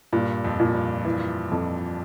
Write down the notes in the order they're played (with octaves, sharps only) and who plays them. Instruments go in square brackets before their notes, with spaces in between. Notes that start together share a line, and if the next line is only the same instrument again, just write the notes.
[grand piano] G2 [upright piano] A#2
[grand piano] F2
[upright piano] A#2
[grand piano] G2
[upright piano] E3
F2